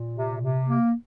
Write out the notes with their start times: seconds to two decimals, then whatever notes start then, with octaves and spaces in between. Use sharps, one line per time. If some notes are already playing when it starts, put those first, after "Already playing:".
Already playing: A#2
0.13 C3
0.41 C3
0.69 A#3